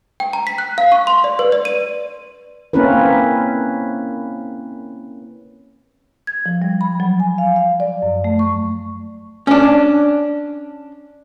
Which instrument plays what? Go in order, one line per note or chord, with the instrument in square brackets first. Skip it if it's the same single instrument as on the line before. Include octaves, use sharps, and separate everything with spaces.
[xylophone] G5
A#5
B6
F#6
F5
C#6
C6
D5
B4
D5
D#7
[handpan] A#3 C4 C#4 E4 A#4 B4
[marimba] G#6
F3
G3
B5
F#3
G#5
F5
F5
D5
F#2
A3
C#6
[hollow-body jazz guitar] C#4 D4